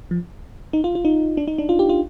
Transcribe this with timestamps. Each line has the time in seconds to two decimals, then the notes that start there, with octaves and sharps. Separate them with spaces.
0.11 F3
0.73 D#4
0.84 F4
0.95 F4
1.05 D#4
1.37 D4
1.48 D#4
1.58 D4
1.69 F4
1.79 G4
1.89 F4